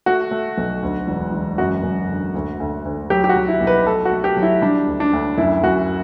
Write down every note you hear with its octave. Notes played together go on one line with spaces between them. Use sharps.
A3 F#4
A3
B1
D2
E1
E1
F#2 F#4
F#2
D3
D2
D2
D2
F#3 G4
G4
F#4
F#3
E4
B1
B4
A3 A4
F#4
A3
G4
F#3
E4
G3 D4
D2
D4
D2
F#2 E4
F#2 F#4